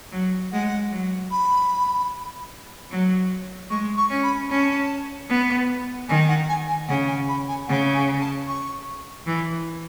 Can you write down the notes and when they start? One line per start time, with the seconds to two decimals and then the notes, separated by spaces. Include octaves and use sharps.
0.12 F#3
0.52 G#3 F#5
0.91 F#3
1.31 B5
2.91 F#3
3.70 G#3 C#6
3.97 C#6
4.10 C#4
4.23 B5
4.50 C#4 A5
5.29 B3
6.08 D#3 G#5
6.28 F#5
6.48 G#5
6.68 G#5
6.88 C#3 F#5
7.07 G#5
7.28 B5
7.48 G#5
7.67 C#3 F#5
7.94 G#5
8.21 A5
8.47 C#6
9.26 E3